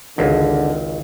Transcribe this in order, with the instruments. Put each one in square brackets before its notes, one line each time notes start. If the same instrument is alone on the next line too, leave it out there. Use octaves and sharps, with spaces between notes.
[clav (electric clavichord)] G#1 C#2 [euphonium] D3